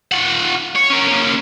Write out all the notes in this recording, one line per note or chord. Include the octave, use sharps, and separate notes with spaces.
F4 F#5
C#5
C#4 A#4
A#3 C#4